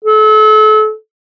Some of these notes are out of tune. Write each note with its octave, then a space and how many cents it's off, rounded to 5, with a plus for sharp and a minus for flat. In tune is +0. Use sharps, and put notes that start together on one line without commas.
A4 -35